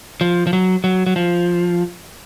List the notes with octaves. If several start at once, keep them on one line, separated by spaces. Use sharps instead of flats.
F3
F3
F#3
F#3
F#3
F3